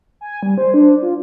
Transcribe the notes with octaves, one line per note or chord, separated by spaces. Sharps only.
G#5
G3
C5
D4
F4